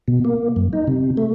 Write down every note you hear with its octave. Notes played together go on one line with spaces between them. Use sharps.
B2
A#3
F#2
D#4
C3
A3